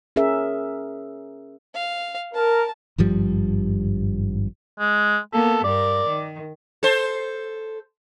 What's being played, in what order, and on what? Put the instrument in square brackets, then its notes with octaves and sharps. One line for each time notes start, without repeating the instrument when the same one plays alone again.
[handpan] C#4 G#4 A#4 E5
[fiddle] F5
[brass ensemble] A#4 [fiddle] A5
[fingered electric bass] G#1 G2 F3 G3
[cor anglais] G#3
[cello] A#3 B3 [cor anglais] A4
[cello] G2 A#4 [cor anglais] D5
[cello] D#3
[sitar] A4 C5